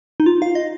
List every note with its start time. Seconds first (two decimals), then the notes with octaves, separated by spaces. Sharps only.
0.20 D#4
0.26 F4
0.42 F5
0.55 D#5